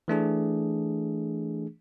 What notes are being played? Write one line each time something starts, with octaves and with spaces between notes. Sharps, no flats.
E3 A3 D4 G#4